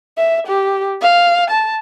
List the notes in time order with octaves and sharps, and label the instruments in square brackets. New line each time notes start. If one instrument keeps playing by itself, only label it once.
[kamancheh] E5
G4
F5
A5